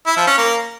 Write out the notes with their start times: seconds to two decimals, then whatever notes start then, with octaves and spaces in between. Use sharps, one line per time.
0.06 E4
0.17 F3
0.27 C#4
0.38 A#3